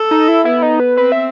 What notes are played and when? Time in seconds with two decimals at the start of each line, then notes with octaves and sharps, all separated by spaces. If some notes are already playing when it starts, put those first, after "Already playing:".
Already playing: A4
0.11 D#4
0.28 E4
0.45 B3 E4
0.62 D#4
0.80 B4
0.97 C4 B4
1.12 E5